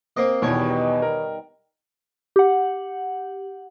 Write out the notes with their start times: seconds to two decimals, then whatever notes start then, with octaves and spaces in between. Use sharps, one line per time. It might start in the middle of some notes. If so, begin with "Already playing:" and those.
0.17 A#3 C4 D#5
0.42 E2 B2 D#3 G3 B3 C#5 F#5
0.70 D#4
1.02 A#4
2.36 G4 F#5